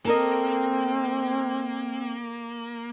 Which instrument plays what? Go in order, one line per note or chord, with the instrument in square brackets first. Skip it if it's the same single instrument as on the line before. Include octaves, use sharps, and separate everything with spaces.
[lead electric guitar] A#3 [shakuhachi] C4 [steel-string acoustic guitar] A4 A#4 D#5